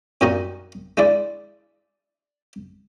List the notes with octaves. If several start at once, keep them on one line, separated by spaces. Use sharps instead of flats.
F#2 A#2 G3 D#4 F#4 D#5
G#3 D4 E4 D5